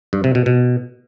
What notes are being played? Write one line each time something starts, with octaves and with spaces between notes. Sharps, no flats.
G2
C3
B2
B2